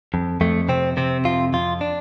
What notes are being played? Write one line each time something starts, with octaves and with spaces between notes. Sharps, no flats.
F2
F2 A3
C3 C4
C3 C4
F2 F4
F2 F4
D4